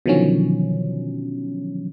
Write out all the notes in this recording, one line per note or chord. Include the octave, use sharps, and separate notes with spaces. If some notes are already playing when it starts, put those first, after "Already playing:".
B2 D3 D#3 F3 F#3 C#4